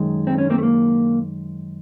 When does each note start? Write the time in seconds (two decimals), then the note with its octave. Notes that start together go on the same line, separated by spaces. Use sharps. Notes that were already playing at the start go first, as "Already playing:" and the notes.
Already playing: F#2 D#3 G#3
0.27 C4
0.38 C#4
0.50 A#3 C4
0.58 A3
0.63 A#3